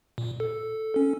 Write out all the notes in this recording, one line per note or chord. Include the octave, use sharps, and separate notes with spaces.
A#2
A4
C#4